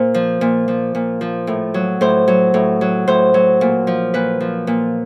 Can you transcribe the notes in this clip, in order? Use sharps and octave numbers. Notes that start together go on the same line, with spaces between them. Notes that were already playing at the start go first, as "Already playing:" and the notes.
Already playing: A#2 C5
F3
A#2
F3
A#2
F3
A2
F#3
A2 C5
F#3
A2
F#3
A2 C5
F#3
A#2
F3
A#2 B4
F3
A#2